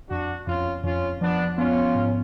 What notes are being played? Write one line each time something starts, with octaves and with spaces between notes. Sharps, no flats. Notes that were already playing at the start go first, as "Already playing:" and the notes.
F2 D4 F#4
F2 C#4 F4
F2 C#4 F4
F3 B3 D4
B3 C#4 F4
G#2